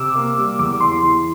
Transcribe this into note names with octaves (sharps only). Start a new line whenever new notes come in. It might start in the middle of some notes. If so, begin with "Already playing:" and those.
Already playing: C3 D6 E6
A#3
G3
E2 D6
E3 C6
E3